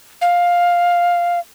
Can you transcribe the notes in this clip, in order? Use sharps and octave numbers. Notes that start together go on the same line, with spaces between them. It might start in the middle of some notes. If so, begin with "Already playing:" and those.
F5